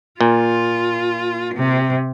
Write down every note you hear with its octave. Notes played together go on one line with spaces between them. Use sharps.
A#2 F4
C3